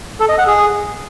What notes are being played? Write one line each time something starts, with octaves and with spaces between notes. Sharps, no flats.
A4
D#5
F#5
G#4